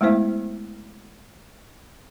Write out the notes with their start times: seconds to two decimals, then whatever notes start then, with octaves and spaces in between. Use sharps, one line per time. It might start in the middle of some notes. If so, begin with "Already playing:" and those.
0.01 G#3 A3 B3 E4 C5 E5